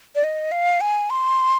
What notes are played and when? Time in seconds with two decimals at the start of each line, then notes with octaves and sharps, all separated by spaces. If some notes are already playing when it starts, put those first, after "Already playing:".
0.15 D5
0.24 D#5
0.51 F5
0.81 G#5
1.10 C6